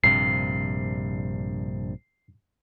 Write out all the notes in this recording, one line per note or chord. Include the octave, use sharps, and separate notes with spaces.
A#1 G2 C3 C7